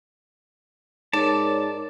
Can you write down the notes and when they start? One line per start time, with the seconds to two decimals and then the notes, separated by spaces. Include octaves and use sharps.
1.13 G#2 A#4 C#5 D5 A5